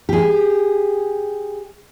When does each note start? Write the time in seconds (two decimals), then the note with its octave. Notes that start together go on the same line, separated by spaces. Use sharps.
0.09 G4 G#4